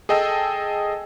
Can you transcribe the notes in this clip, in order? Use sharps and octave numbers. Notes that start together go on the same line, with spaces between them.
G#4 A4 D#5 G5 A5 E6